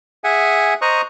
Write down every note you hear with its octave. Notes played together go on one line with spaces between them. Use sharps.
G#4 E5 F#5 G#5
C5 D#5 A#5 C#6 D#6 F#6